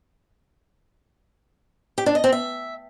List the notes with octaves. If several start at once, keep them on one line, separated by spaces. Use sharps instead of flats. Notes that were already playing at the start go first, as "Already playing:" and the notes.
G4
D4
D#5
C4
E5